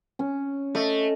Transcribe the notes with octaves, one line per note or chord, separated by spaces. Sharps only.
C#4
A3 D#5